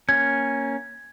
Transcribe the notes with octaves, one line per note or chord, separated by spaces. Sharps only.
A#3 C#4 G#6